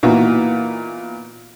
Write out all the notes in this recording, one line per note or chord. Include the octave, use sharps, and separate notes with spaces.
A#2 E3 B3 D#4 F#4